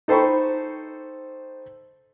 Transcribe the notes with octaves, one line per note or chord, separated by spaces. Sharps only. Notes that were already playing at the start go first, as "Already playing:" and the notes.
D#4 A4 C5 G5 B5 C#6